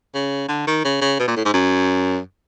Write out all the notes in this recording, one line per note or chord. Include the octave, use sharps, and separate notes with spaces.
C#3
D3
D#3
C#3
C#3
B2
A#2
A2
G#2
F#2